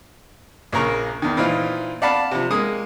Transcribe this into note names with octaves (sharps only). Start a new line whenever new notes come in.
A#1 C#3 A#3 A#4 A#5 C#6
E2 D#3
A#2 E3 C4 D#4 F4
D5 F5 F#5 A5 B5
C3 F3
G#3 A#3 D#6